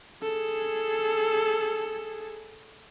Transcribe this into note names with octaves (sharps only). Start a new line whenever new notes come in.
G#4 A4